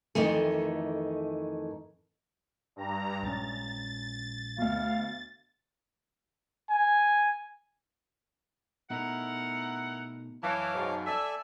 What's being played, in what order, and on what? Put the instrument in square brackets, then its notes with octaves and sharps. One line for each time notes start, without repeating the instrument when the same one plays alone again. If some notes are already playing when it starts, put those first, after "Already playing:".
[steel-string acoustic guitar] F2 D#3 E3 A3
[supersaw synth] G2 A#5
[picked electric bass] A#1 G#3 C#4 [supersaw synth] A6
[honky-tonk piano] D2 B2 [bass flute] F5
[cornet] G#5
[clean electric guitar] B2 A3 D#4 [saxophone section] E4 A#4 F#5
[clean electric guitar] F#2 A5 [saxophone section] E3 [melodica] C#5 F5 D6
[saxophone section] G#2 B2
[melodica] A4 D5 G#5 [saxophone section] E5